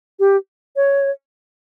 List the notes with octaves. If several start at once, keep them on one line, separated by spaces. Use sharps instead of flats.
G4
C#5